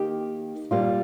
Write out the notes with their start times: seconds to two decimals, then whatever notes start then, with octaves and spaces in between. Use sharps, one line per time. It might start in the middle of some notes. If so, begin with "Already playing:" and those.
Already playing: D#3 A#3 D#4 G4
0.71 A#2 G3 A#3 F4